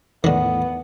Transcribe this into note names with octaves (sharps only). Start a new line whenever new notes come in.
E2 A2 D3 D#3 B3